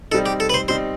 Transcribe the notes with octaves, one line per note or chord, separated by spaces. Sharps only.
G3 C4 D#4 A4
G4
A4
B4
C5
G3 C4 D#4 C5